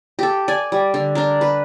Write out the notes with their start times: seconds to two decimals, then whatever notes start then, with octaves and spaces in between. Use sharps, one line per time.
0.19 G4 A4
0.48 D5 G#5
0.72 G3
0.94 D3
1.15 D4 A#4
1.41 B4